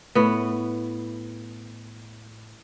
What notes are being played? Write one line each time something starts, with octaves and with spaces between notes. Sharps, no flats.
A2 B3